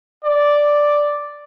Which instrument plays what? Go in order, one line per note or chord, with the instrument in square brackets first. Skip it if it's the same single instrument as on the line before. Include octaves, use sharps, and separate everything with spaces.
[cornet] D5